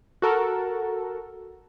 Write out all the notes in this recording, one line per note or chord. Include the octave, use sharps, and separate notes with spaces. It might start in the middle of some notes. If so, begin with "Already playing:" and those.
F#4 A4 A#4